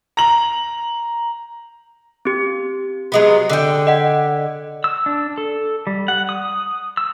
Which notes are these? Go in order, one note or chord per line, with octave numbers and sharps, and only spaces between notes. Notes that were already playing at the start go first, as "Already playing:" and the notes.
A#5 F#7
C4 G4
F#3 G#3 B3
D3 G5
D#5 F#5
E6
D4
A4
G3
F#5
D#6
E6